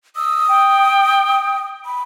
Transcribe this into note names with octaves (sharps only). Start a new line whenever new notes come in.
D#6 E6
G5
B5